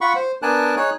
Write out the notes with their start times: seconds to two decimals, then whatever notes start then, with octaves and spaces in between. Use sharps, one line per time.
0.01 F4 F#5 B5 C#6
0.16 C5
0.42 B3 D4 A#4 G#5 A5 F#6
0.76 D#4 G#4 C#5 F#6